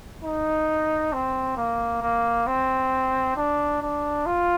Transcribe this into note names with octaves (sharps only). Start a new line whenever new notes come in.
D#4
C4
A#3
A#3
C4
D4
D4
F4